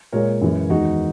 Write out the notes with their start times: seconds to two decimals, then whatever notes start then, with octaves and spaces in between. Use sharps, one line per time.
0.12 A#2 G#3 A#4 C#5
0.41 F#2 E3 G#3
0.70 E2 D#3 G#3 D#4 F#4